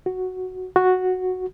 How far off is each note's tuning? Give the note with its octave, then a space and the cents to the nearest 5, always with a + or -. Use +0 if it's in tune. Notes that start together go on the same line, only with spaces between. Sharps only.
F#4 +0
F#4 -5